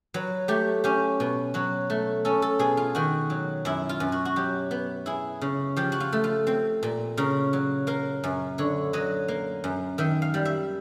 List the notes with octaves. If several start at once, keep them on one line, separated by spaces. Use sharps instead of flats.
F#3 B4
A3 G4
C#4 G4
B2
F#3 F#4
A3
C#4 A4
A4
B2 G#4
F4
D#3 F#4
F#3
F#2 E4
F4
F#2
F#4
F#4
F#3 G4
B3
E4 G#4
C#3
F3 G4
F#4
F4
A3
F4
C4
A#2
C#3 A#4
F#3
A#3 A#4
F#2
D3 C#5
F#3 D#5
A#3
F#2
D#3 E5
F5
G3
E5